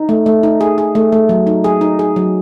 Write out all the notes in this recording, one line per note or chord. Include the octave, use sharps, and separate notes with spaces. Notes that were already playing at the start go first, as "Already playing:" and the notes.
Already playing: D#4
A3
A3
D#4
G#4
G#4
A3
A3
F#3
D#4
G#4
D#4
G#4
F#3